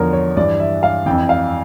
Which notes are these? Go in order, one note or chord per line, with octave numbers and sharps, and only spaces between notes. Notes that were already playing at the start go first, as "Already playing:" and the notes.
Already playing: E2 D3 F3 A#4 C#5
C#5
G2 E3 D5
E5
F5
F2 E3 G5
F5